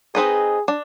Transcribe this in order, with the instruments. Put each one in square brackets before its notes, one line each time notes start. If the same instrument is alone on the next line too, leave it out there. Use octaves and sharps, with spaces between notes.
[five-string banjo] C4 D#4 B4 D#5 [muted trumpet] G#4
[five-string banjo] D4